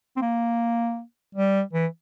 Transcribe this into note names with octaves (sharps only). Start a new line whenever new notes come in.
C4
A#3
G3
E3